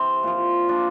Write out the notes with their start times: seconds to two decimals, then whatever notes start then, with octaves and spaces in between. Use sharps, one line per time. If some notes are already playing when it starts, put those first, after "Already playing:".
Already playing: C3 E3 C4
0.23 A#2 F3
0.69 A#2 F3 D4